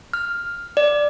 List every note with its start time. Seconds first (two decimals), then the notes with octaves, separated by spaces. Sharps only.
0.13 F6
0.77 D5